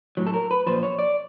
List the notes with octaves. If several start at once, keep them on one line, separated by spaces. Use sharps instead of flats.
A2 F#3
A4
A#4
B4
A#2 F3 C5
C#5
D5